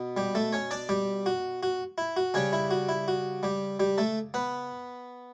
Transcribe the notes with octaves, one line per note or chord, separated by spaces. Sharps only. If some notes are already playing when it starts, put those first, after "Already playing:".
Already playing: B2 B3
G3 G4
A3 A4
C#4 C#5
D4 D5
G3 G4
F#4
F#4
E4
F#4
C#3 G3 C#4 D4 C#5
E4
F#4
E4
F#4
G3 G4
G3 G4
A3 A4
B3 B4